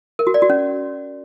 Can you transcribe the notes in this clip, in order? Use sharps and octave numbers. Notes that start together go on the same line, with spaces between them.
A#4
F#4
D5
F#4
C#4